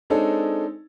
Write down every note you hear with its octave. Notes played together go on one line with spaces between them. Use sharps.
G#3 C4 D4 D#4 A4 C#5